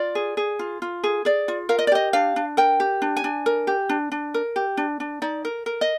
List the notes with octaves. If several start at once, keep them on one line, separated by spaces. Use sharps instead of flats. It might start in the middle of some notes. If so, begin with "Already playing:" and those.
Already playing: F4 D5
G#4
G#4
F4
F4
G#4
G#4 D5
F4
A#4 F5
D#5
D5
G4 D#5
D4 F5
D4
A#4 G5
G4
D4
G#5
D4
A#4
G4
D4
D4
A#4
G4
D4
D4
D#4 D5
A#4
A#4
D#5